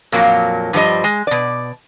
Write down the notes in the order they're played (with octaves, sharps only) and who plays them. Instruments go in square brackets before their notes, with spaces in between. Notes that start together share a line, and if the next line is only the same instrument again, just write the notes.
[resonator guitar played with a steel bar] F2 A#2 F#3 A#3
G2 F3 G3 D#5
G#3
B2 D5